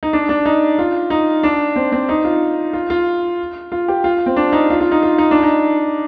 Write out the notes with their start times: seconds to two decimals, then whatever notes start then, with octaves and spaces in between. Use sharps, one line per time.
0.03 D#4
0.13 D4
0.29 D4
0.45 D#4
0.79 F4
1.10 D#4
1.43 D4
1.76 C4
1.92 C4
2.09 D#4
2.24 F4
2.73 F4
2.90 F4
3.72 F4
3.88 G4
4.04 F4
4.26 C4
4.37 D4
4.53 D#4
4.70 F4
4.81 F4
4.92 D#4
5.03 F4
5.18 D#4
5.31 D4
5.43 D#4